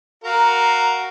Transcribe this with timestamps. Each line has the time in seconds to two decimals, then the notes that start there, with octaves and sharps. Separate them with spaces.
0.24 F#4 A#4 F5 A#5